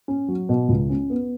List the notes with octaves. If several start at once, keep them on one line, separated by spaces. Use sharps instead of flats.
C#4
F#3
B2
C#2
C#4
B3